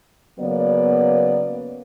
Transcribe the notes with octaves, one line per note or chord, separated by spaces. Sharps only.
C#3 F#3 A#3 B3 D5